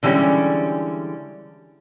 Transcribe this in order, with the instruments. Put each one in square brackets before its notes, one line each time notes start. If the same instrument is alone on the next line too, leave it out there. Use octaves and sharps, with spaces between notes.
[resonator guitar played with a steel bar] D3 E3 G3 G#3 C#4